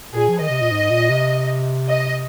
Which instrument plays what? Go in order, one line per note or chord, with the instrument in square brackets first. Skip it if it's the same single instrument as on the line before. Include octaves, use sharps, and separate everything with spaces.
[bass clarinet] A#2 [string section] G#4
[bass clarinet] F3
[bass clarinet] D#3 [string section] D#5
[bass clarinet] C3
A#2
G#2
A#2
C3
[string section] D#5